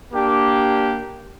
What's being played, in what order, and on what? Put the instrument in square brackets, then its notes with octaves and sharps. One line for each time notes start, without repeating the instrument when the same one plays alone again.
[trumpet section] A#3 D4 G4